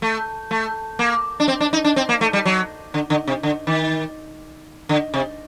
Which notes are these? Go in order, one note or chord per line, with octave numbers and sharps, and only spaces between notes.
A3
A3
A#3
D4
C4
D4
D#4
D4
C4
A#3
A3
G3
F#3
D3
D3
C3
D3
D#3
D3
C3